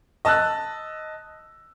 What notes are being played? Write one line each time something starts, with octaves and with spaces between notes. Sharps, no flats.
D#5 A5 E6 F#6